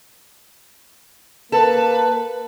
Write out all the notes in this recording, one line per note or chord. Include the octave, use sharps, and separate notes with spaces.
A#3 A4 B4